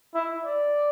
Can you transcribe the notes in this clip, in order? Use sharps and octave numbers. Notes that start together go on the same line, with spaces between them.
E4
D5